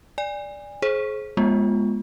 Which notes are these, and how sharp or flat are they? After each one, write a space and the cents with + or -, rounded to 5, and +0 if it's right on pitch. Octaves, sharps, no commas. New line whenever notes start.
D5 +0 G#5 -30
G#4 +35 C5 +30
G#3 +0 B3 -30 F4 +0